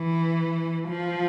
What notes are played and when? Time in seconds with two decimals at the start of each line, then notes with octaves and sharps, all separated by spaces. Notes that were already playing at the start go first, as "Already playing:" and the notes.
Already playing: E3
0.88 F3